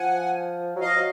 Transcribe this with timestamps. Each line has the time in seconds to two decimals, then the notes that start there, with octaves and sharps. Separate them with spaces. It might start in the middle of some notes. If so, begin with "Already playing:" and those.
Already playing: F3 F#5 G#5
0.76 F#3
0.81 F3 D#5 F5
0.96 F#3